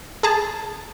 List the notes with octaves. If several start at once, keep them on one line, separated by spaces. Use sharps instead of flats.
G#4 A5